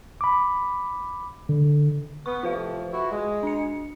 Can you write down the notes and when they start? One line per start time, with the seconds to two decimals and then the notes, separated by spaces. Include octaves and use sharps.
0.21 B5 D6
1.49 D3
2.26 B3 C#6
2.43 A2 C3 F3 F4 B4 F5
2.92 E4 F#4
3.11 G#3
3.43 D4 C#7